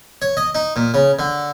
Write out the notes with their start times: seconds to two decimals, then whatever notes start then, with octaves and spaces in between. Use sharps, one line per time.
0.22 C#5
0.37 D#5
0.55 D#4
0.76 A#2
0.94 C#3
1.19 D3